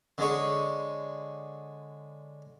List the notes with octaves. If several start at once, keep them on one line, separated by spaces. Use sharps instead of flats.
D3 G#3 C#5